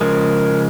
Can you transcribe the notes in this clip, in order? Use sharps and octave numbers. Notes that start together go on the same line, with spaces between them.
C#3 F3 G#3 A#4